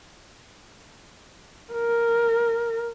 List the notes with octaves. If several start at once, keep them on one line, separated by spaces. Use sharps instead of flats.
A#4